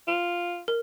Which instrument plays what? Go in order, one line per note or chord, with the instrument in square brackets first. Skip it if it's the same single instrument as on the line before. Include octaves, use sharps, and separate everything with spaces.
[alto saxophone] F4
[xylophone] A#4